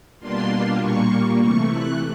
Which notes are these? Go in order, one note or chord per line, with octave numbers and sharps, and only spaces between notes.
B2 G3 A#3 D4 F4 C6
A#2 G3 A#3 C#6
C3 E3 A3 C#6
F#6